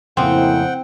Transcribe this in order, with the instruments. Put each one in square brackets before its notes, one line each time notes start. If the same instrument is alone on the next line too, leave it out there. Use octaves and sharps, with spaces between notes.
[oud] F2 C#3 [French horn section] A2 A#3 E4 [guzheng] C4 [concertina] F#5 G5